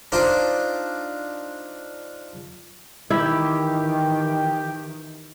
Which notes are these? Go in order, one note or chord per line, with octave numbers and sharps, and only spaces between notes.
D4 D#4 F4 C5
D#3 E3 E4 G4